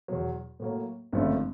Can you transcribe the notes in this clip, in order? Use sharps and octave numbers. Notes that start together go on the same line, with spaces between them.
E2 B2 F#3
A2 F#3 A#3
G#1 F#2 D3 F3 A3